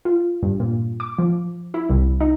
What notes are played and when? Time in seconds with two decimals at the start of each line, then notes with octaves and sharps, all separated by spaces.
0.05 F4
0.43 G2
0.60 A#2
1.00 D6
1.18 F3
1.74 E4
1.90 C2
2.21 D#4